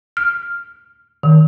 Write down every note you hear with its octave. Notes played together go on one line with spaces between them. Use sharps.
F6
D#3